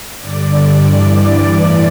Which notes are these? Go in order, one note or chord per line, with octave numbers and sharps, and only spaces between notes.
G2 D3 D5
G2 E3
A2 E3 D5